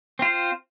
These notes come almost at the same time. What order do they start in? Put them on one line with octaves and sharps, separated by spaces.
C4 F4 C5